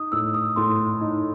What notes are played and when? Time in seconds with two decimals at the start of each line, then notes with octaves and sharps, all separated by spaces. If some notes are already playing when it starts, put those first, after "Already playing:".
Already playing: D#4 D#6
0.12 A2 E6
0.34 D#6
0.56 A2 C6
1.01 D#4